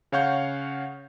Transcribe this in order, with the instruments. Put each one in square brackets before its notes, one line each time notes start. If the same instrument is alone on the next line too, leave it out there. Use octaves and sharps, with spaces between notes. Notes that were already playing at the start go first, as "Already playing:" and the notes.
[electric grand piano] C#3 C#5 F5 F#5 C#6 G6